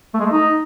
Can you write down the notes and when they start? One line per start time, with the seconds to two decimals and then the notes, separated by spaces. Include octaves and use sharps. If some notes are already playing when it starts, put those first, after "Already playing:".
0.14 A3
0.20 G#3
0.26 A3
0.32 D#4